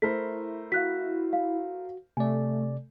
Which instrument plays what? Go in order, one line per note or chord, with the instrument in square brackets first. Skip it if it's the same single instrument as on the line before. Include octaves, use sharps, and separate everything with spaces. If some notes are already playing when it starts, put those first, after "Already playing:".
[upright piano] A3 A#4 C5 [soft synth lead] E4 [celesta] B6
[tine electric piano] F#4 [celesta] F5 F#6 B6
[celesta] F5
[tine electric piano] C3 D5 [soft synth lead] A3 [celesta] G#5